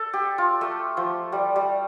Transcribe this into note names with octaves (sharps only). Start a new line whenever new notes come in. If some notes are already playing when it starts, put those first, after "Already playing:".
Already playing: A4
G4
F4
A3
F3
G3
G3